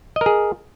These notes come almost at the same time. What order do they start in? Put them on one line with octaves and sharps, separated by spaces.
D#5 A#4 G#4